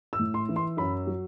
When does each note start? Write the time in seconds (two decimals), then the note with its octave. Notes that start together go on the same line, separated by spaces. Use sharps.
0.13 E6
0.19 A2
0.34 C6
0.49 E3
0.56 C6
0.77 F#2 B5
1.07 F#3